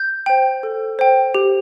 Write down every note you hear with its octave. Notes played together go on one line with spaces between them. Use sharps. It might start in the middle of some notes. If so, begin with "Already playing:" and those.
Already playing: G6
C5 G5
A4
C5 G5
G4